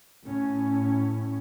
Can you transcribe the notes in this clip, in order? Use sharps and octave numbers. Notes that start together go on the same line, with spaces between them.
A2 C#4